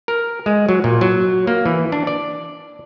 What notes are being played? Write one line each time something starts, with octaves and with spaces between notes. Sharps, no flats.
A#4
G#3
F#3
A#2
F#3
A#3
E3
D4
D5